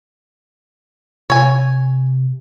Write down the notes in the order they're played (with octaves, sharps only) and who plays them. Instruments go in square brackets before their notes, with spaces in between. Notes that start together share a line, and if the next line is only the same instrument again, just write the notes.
[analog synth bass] C3 [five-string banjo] C#5 G#5